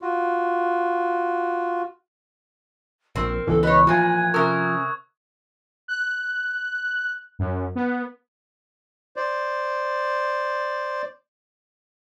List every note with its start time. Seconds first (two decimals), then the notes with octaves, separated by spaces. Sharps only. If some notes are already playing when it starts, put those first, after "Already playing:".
0.02 F4 F#4
3.15 A#1 C4 A#4
3.47 C#2 B2 E3 A4
3.63 B4 C#5 D#5
3.87 E2 A#2 F3 G#5 F#6 G#6
4.34 C3 C#4 A#4 C#6 D#6 E6
5.88 F#6
7.39 F#2
7.75 B3
9.16 C5 D5